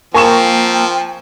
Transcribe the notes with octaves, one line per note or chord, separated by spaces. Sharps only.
F3 A#3 C4 G5 G#5 A#5 C#6 E7